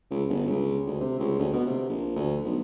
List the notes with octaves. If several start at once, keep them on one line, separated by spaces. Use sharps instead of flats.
C#2
G1
C#2
D2
C3
C#2
D2
B2
C3
A#1
D2
B1